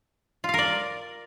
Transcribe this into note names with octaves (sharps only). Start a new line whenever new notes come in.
F4 A#4 D5 F5